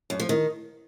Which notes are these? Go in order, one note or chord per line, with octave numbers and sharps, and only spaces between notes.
F#2
F3
D#3